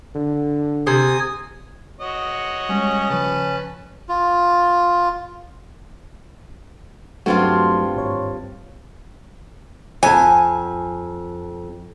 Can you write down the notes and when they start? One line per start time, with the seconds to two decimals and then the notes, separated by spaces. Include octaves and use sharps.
0.15 D3
0.87 C3 G#5 D#6
2.01 F#4 C#5 D#5
2.69 G3 G#3 C#4
3.10 C#3 F3 B4 A5
4.09 F4
7.26 G2 F#3 A3 C4 F4 F#4
7.96 G#1 C#5
10.03 F2 G#5 A5